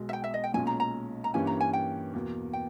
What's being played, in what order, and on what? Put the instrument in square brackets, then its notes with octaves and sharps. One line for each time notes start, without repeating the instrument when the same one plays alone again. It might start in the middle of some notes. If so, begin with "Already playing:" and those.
Already playing: [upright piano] B1 B2 G#3
[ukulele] E5
G5
E5
D#5
G5
[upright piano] B1 A#2 G#3 C#4 [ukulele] G#5
[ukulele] A#5
A#5
A#5
[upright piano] G2 E3 A#3 C#4 G4 [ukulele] G#5
[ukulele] A#5
G#5
G5
[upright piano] E2 B2 A#3
[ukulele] G5